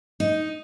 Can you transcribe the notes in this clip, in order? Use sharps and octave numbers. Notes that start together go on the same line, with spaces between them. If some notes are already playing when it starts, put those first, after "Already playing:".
D#4